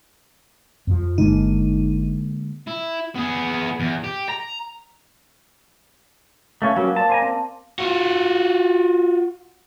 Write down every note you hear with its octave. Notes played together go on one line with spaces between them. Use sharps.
F2 F3
G1 D3 G#3 A#3 D#4
E4
B3 G#4
E2
G4
A#5
A3 C#4 B4 C#5 F5
F#3 G3 A#3 C#4
C4 D5 A5
C5 F#5 G#5 A#5
C4 A5
F4 F#4